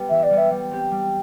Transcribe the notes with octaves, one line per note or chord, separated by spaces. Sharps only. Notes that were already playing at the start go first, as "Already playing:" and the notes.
Already playing: G3 B3 G4
E3 E5
D5
G3 B3
E5
G3
C4 G4
G3